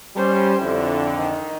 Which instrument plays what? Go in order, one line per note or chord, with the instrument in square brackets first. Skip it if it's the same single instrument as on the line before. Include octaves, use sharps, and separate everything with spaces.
[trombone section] G3 C#4 [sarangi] C5
[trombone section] F2 D3 [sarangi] E4
[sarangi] D#3